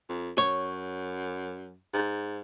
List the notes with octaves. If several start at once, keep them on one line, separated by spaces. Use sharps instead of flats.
F2
F#2 C#5
G#2